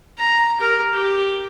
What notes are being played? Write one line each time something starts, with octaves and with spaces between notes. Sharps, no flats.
A#5
G4 A#4
G4